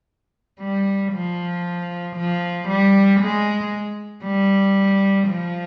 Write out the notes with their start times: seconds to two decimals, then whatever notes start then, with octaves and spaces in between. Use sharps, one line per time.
0.60 G3
1.12 F3
2.16 F3
2.68 G3
3.20 G#3
4.24 G3
5.28 F3